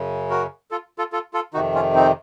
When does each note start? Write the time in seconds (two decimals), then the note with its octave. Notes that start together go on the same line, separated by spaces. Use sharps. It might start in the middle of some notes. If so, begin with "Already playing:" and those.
Already playing: F#2 C#3
0.30 F#4 A#4
0.71 F4 A4
0.98 F4 A4
1.13 F4 A4
1.34 F4 A4
1.54 F2 C3 D#3 D#4 F#4
1.75 C#4 F4
1.95 C4 D#4